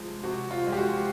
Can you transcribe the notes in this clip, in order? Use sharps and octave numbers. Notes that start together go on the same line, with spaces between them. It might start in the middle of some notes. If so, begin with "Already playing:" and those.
Already playing: C3 F3 G#3
C3 F#4
F4
F3 G#3
G4
F#4